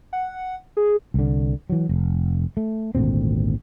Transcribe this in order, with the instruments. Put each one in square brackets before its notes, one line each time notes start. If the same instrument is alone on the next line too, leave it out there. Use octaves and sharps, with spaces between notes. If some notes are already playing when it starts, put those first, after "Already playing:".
[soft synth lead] F#5
G#4
[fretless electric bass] C2 D3
E3 F#3
F1
A3
G#1 D2 A#2 C4